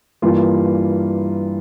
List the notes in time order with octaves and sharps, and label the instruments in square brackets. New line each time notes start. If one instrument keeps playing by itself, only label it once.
[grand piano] G2 E3 A#3 F4